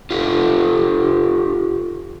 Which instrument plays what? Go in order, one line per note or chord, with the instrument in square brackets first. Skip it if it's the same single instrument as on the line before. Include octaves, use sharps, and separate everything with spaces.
[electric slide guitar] F4 G4 A4